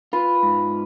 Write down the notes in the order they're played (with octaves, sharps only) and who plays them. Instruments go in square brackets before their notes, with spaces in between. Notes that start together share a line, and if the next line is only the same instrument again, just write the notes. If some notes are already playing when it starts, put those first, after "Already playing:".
[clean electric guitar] F4 [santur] B4
[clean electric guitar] G#2